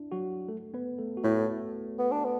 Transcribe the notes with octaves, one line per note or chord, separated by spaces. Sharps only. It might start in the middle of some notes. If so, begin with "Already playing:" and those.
Already playing: D4 E4
F#3 F#4
A3 A4
B3 B4
A3 A4
F#4
A2 A3 A4
B3
D4
B3